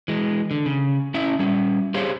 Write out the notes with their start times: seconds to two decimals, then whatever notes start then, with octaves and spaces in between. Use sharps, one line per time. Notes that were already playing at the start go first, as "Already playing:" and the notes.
0.08 E3 G#3
0.51 D3
0.66 C#3
1.14 C#4 E4 E5
1.39 G3 C#4
1.94 G4 G#4 C5 C#5 F5